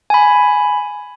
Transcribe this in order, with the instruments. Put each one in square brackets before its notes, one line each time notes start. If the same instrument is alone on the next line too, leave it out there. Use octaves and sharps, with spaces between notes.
[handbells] G#5 B5